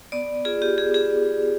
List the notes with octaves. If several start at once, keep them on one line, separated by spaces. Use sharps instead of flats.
B3 D5
F4 G#4
G4
B3 G#4
G#4